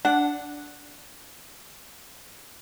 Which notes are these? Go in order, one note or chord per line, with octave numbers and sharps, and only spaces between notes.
D4 F#5